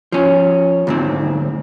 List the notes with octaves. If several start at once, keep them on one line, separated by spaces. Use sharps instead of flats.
F3 C#4
D2 G#2 C4